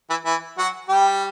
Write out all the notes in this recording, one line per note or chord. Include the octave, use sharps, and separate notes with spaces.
E3 E4
E3 E4
F#3 F#4
G3 G4